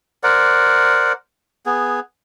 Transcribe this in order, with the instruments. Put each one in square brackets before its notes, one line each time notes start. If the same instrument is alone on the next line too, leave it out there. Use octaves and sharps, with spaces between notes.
[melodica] A#4 C5 D5 F#5
B3 G#4